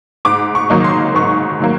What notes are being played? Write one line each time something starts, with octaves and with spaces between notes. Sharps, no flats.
G#2 D6
C#6
D#3 F#3 A#3 D#4
C6
G#2 C#6
D#3 F#3 A#3